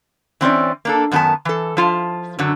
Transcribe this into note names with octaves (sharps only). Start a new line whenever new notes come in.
E3 C4 C#4 D5
A#3 D4 A4
F#2 D#3 B3 F4 G#5 A5
E3 A4
F3 F4 A5
F#2 D3 F#3